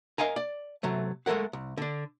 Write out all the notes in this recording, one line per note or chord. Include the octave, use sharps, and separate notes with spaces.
A#4 D#5 F5 G#5 A#5
D5
C3 F#3 A3
G#3 A3 A4 A#4 F#5
C2
D3 D4